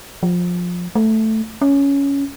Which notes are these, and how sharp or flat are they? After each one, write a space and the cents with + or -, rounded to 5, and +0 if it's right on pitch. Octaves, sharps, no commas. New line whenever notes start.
F3 +20
A3 +0
C#4 +10